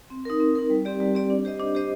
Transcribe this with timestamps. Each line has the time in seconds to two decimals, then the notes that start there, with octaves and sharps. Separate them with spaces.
0.10 C4
0.25 D#4 A#4
0.40 C4
0.55 D#4 A#4
0.70 G3
0.85 C4 G4 D5
1.00 G3
1.15 C4 G4 D5
1.30 D4
1.45 G4 C5 D#5
1.60 D4
1.75 G4 C5 D#5